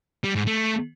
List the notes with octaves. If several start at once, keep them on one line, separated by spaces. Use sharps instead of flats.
G3
G#2
A3